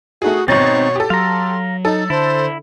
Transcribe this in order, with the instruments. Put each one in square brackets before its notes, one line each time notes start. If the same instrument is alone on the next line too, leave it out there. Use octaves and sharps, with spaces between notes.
[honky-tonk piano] A3 D#4 G#4 [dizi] F#4
[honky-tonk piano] G#1 A6 [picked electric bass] B2 [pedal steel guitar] C4 D#4 [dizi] C#5
[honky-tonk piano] G4 A4
[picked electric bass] F#3 [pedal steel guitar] F5 A#5 [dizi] C6
[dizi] D#4 [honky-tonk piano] A4
[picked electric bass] D3 [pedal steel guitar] E4 [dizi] C5